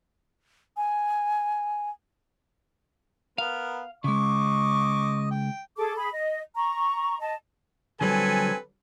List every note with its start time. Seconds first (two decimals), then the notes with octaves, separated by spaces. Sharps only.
0.77 G#5
3.38 B3 A#4 F5
4.04 C#3 G#3 D#5 C#6 D6
5.31 G5
5.77 G#4 A4 D6
5.96 G#4 B5
6.13 D#5
6.55 A#5 C#6
7.20 D#5 A5
8.01 D3 F#3 G3 C4 A4 B4 G#5